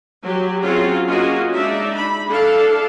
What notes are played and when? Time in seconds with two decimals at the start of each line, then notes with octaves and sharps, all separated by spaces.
0.22 F#3 G4
0.62 F#3 C4 C#4 F4 F#4 G#4
1.07 A#3 C#4 F4 F#4 G#4 D#5
1.53 G#3 D4 D#4 D5 E5
1.95 B5
2.28 D4 E4 A4 F5 A5